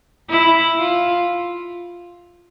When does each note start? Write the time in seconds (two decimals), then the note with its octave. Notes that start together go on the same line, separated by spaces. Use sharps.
0.30 E4
0.79 F4